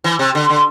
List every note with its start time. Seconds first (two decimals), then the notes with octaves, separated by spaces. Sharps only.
0.04 E3
0.19 C3
0.35 D3
0.49 D3